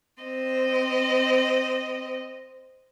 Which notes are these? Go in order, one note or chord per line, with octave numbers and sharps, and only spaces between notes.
C4 D#5